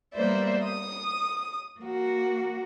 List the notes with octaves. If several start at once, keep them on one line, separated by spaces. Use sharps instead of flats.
G3 A#3 B3 C5 D5 E5
D#6
A#3 F#4